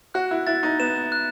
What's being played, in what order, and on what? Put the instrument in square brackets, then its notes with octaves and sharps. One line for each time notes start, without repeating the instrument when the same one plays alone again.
[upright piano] F#4 [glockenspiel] F#6
[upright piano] E4
[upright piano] E4 [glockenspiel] A6
[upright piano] D#4
[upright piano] B3 [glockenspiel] E7
[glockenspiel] F#6